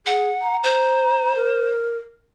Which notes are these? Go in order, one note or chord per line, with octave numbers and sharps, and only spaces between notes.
G#4 F#5
A#5
C5
A#4